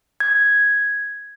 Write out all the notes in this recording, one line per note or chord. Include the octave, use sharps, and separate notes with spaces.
G#6